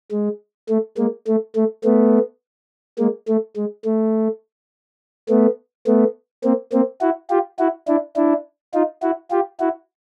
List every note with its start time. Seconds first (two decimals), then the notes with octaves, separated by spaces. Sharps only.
0.12 G#3
0.69 A3
0.98 G#3 A#3
1.27 A3
1.56 A3
1.84 A3 B3
2.99 G#3 A#3
3.28 A3
3.57 G#3
3.85 A3
5.29 A3 B3
5.87 A3 B3
6.44 A#3 C4
6.72 A#3 C4
7.01 E4 F#4
7.30 F4 G4
7.59 E4 F#4
7.88 D4 E4
8.16 D4 E4
8.74 D#4 F4
9.02 E4 F#4
9.31 F4 G4
9.60 E4 F#4